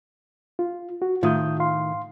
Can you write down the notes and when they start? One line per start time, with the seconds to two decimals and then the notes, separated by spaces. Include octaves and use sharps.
0.59 F4
1.02 F#4
1.23 A2 D#3 F4 D#6 G6
1.60 F5 C6